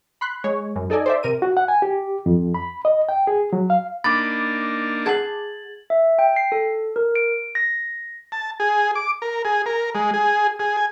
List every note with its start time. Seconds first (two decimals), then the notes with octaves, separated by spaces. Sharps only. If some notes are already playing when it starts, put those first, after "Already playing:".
0.21 B5 C6 F#6
0.44 G#3 C#5
0.76 F#2
0.90 D#4 A4 D5 D#5 G#5
1.06 C5 D5 E5
1.23 C3 A#4 D#7
1.42 F#4
1.57 F#5
1.68 G#5
1.82 G4
2.26 F2
2.54 B5
2.85 D#5
3.09 G5
3.27 G#4
3.53 F#3
3.70 F5
4.04 A#3 D4 D#4 B5 D6 A6
5.06 G#4 F#5 A5 G#6 F#7
5.90 E5
6.19 G5
6.36 C7
6.52 A4
6.96 A#4
7.16 D7
7.55 A#6
8.32 A5
8.60 G#4
8.95 D6
9.22 A#4
9.45 G#4
9.66 A#4
9.95 G#3
10.14 G#4
10.59 G#4
10.77 G#5